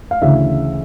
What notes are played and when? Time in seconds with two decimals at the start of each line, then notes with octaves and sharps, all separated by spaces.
0.11 F5
0.22 D2 C#3 E3 E5